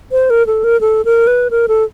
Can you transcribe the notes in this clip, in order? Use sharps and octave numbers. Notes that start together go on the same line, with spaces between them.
C5
A#4
A4
A#4
A4
A#4
B4
A#4
A4